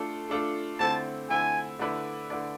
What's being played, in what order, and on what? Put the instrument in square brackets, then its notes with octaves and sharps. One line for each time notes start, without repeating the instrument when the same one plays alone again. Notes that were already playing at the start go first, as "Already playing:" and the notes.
Already playing: [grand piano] A3 D4 F4 A4
A3 D4 F4 A4
[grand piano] D3 A3 C4 E4 [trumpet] A5
[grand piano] D3 A3 C4 E4 [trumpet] G#5
[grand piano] D3 A3 E4 B4 D5
D3 A3 E4 B4 D5